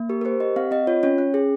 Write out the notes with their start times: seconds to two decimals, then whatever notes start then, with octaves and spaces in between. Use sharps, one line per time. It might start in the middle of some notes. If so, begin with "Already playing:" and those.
Already playing: A#3
0.09 G4 A#4
0.21 A#4
0.25 G4 C5
0.40 G4 D#5
0.56 C4 F5
0.71 C4 D#5
0.87 F4 C#5
1.03 C#4 C#5
1.18 C#4
1.34 G#4